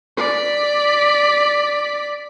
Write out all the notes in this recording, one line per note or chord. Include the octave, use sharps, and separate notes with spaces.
D5 B6